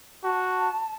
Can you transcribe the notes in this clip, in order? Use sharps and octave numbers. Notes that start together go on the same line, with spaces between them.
F#4 A5